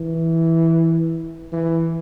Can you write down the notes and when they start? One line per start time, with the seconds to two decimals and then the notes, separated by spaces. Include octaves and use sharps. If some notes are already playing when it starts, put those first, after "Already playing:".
Already playing: E3
1.52 E3